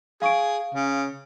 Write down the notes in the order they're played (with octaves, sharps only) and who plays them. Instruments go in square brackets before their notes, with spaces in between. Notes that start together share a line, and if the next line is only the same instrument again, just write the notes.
[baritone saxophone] G#4 [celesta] F5 C#6 D7
[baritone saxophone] C#3